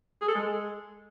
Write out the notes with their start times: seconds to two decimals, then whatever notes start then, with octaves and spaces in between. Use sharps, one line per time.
0.21 G#4
0.28 A4
0.35 G#3